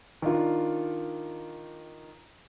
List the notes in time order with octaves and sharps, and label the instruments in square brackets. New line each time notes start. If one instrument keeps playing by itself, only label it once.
[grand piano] D#3 D4 F4